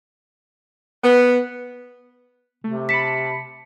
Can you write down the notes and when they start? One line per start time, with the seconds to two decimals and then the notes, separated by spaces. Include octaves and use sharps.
1.03 B3
2.64 C3 A3
2.89 A5 B5 B6 C#7